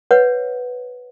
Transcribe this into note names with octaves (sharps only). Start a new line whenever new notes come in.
B4 C#5 F#5